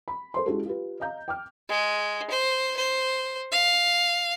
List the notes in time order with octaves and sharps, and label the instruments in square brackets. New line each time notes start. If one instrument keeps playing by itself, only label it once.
[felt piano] B5
A4 C5 C6
G#3 C#4 E4 F#4 G4 A4
F4 G4 B4
D#5 F5 A#5 G6
G5 D6 F6
[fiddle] G#3
C5
C5
F5